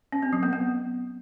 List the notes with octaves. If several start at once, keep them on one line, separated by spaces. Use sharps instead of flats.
C#4
C4
F#3
B3
B3